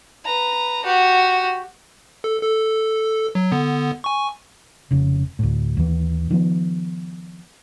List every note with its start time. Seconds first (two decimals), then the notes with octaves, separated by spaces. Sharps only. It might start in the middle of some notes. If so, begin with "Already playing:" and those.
0.25 B4 A#5
0.84 F#4 G4
2.24 A4
2.43 A4
3.35 F#3
3.52 D3 B3
4.04 G#5 C#6
4.91 F1 C#3
5.39 D2 A2
5.77 D#2 E3
6.30 D#3 F3 B3